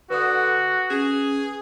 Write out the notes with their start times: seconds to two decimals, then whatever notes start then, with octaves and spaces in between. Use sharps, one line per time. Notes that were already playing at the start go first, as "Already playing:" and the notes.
0.10 D3 F#4 B4 D#6
0.90 C#4 G#4